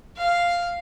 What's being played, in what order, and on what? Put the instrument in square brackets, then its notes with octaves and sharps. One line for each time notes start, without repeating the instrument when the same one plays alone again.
[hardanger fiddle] F5